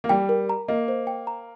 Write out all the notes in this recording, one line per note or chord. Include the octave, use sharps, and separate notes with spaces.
A#3
G3 G5
A#4
A#5
A#3 D#5
C5
G5
A#5